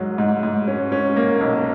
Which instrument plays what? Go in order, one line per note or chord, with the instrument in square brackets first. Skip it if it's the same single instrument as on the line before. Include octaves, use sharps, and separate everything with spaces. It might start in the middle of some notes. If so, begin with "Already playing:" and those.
Already playing: [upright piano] G#2 F#3
G#2
G#2
C#4
C#4
A#3
B1